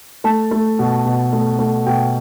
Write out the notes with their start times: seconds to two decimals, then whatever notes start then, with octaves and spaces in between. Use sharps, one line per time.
0.24 A3 A5
0.51 A3
0.79 B2
1.06 B2
1.33 A3
1.59 A3
1.86 B2 G5